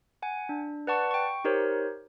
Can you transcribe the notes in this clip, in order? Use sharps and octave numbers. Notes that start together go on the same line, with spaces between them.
F#5 G#5
D4
B4 D5 F#5 A5 C#6
G5 C#6
D#4 G4 A#4 C5 C#5